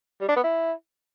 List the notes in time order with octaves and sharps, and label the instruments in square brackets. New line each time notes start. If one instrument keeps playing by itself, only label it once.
[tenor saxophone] G3
D4
B3
E4